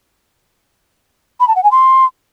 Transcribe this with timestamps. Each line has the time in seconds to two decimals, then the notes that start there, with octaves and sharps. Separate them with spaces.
1.40 B5
1.48 A5
1.56 F#5
1.64 G#5
1.71 C6